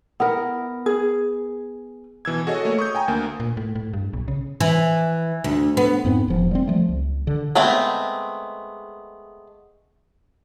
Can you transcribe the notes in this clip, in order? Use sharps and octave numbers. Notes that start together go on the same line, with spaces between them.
B3 E4 A#4
G#4
B2 E3 E6 G#6
F#4 G#4 A4 C#5 D#5
A3 A#3 C#5
C#6 D#6 G6
G5 G#5 A#5
D2 A#3
A#2
A2
A2
G2
B1
C#3
E3
D2
B3
F2 G#2 B3 C4
E1 F3
G3 G#3 C4
F3 G3 A3
C#2
D3
G#3 A3 B3 C4